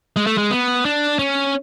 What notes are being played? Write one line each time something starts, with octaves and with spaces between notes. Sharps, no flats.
G#3
A3
G#3
B3
D4
C#4